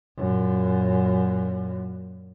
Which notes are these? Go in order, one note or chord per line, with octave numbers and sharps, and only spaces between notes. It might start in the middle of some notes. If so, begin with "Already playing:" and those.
F#2 A#2